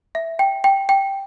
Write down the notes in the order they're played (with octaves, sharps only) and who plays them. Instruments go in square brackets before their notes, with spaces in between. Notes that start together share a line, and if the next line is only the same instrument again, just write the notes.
[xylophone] E5
G5
G5
G5